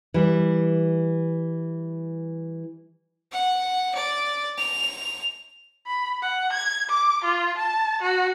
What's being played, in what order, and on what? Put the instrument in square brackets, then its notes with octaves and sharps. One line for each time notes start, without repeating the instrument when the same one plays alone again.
[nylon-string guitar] E3 G3
[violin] F#5
D5
F7
[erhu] B5
F#5
G#6
D6
F4
A5
F#4